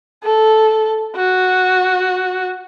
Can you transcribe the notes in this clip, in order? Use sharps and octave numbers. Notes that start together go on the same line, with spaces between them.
A4
F#4